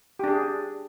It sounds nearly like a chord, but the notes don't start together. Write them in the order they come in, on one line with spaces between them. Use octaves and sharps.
G4 D4 G#4